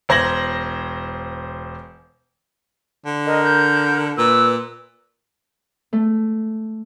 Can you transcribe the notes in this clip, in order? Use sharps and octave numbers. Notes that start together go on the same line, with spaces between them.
E1 C5 G#6 A#6 F#7
D3
A#4 D#5
G6
A#2 B4 E6
A3